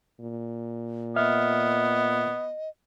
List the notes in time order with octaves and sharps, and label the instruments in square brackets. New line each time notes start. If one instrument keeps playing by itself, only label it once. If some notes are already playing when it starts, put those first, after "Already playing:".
[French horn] A#2
[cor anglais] B3 [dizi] D#5 [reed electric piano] E5 F6